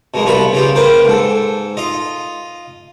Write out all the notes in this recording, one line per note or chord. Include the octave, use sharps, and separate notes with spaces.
B2 G#3 A#3
C2 B3 F4 F#4 B5
C#3 F4 G4
A#3 B4 C5 G5
G#2 A4
F4 D#5